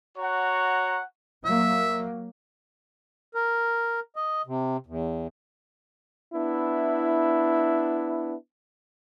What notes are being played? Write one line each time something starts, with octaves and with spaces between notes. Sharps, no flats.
F#4 C#5 F#5 A#5
F#3 A#3 E5
A#4
D#5
C3
E2
B3 D4 E4